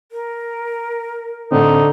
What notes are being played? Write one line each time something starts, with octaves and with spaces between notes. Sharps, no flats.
A#4
A2 D3 C4 D#4